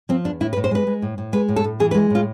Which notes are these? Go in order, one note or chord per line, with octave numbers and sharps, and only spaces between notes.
F3 C4
E2 D4
A2 E4
B4
A2
C5
G#3 B4
G#3
A2
A2
G#3 B4
A2
A4
A2
E3 G#4
B4
G#3
A2 F4